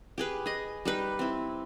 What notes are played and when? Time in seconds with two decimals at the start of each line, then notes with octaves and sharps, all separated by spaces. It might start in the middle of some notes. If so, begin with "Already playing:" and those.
0.18 G4 G#4 B4
0.46 G#4 D#5
0.85 G3 D#4 B4
1.19 C4 E4